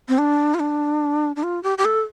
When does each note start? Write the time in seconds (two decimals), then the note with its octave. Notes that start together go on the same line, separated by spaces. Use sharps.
0.08 C4
0.18 D4
0.54 F4
0.59 D4
1.36 D4
1.43 F4
1.63 G4
1.78 G4
1.85 A4